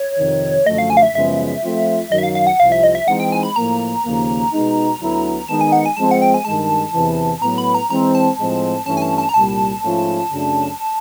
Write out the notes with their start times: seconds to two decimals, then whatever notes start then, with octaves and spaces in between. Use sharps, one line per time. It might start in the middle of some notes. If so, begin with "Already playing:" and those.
Already playing: C#5
0.19 F2 C3 D#3
0.66 F#2 D3 F3 A3 D#5
0.78 F5
0.90 G#5
0.97 F5
1.03 E5
1.15 F#2 C#3 F3 G#3 B3 E5
1.63 F3 A3 C4 F4
2.11 F#2 D#3 F#3 D#5
2.18 E5
2.23 F5
2.35 F5
2.47 F#5
2.60 C2 C3 F3 F5
2.72 E5
2.83 D#5
2.95 E5
3.08 E3 G#3 C4 D#4 F#5
3.20 G5
3.32 G#5
3.43 B5
3.56 A2 F3 A#3 A#5
4.05 D#2 C#3 F3 A#3
4.52 B2 G#3 B3 D#4
5.00 D2 D3 F#3 B3 E4
5.48 D#3 G#3 B3 D#4 A5
5.61 G#5
5.72 F#5
5.86 G#5
5.97 F3 G#3 C4 A5
6.11 F#5
6.22 G5
6.34 G#5
6.45 G2 D#3 G#3 A5
6.94 E2 C3 E3
7.41 A2 F#3 B3 A#5
7.58 B5
7.74 A#5
7.90 E3 G#3 C4 A#5
8.15 A5
8.38 A2 F3 G#3 C4
8.86 G2 E3 A3 C#4 A5
8.97 G#5
9.02 A5
9.18 A5
9.29 A#5
9.34 C2 A#2 G3 A5
9.83 G#2 F3 A3 C#4 F4
10.31 F#2 C#3 F#3 A3 D4